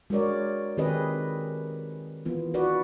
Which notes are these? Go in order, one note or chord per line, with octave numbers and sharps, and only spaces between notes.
G#3 F#4 A#4 C#5 D5
D#3 C4 G4 G#4 B4 D#5
E3 B3 F4
D#4 F#4 B4 D5